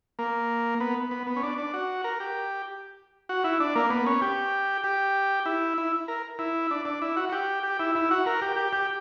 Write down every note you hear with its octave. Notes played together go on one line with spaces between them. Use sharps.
A#3
B3
B3
B3
C#4
D4
D4
F#4
A#4
G4
F#4
E4
D4
A#3
B3
C#4
G4
G4
E4
E4
A#4
E4
D4
D4
E4
F#4
F#4
G4
G4
E4
E4
F#4
A#4
G4
G4
G4